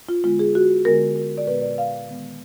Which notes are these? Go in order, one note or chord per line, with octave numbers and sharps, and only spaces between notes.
F4
D3 G#3 B3 F4
G#4
F#4
D3 G#3 B3 A#4
A#4
D5
A#2 G#3 B3 B4
D5
F5
D#3 G#3 B3